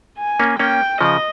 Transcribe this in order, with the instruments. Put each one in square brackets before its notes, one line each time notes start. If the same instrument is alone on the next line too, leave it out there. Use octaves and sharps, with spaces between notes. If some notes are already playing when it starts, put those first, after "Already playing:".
[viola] G#5
[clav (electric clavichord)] A#3 C#4
[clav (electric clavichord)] A#3 C#4 [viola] G5
[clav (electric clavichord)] C#3 F3 [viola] D#5